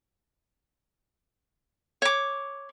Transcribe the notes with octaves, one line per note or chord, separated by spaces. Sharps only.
C#5 D6